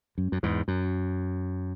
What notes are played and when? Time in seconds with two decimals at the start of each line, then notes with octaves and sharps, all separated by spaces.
0.18 F#2
0.32 F#2
0.43 E2 G#2
0.68 F#2